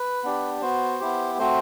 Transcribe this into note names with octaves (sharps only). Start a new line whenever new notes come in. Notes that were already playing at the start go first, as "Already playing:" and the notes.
Already playing: B4
B3 D4 G4
B3 F#4 C5
B3 E4 G4
A3 C4 F#4 C5